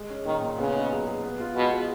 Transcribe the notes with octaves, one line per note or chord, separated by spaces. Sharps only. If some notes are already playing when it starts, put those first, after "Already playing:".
Already playing: G#3
C#4
A#2 D#3
A#2
C#3 B3
D#4
F#3
G#4
B3
F4
B2 G#3
G#4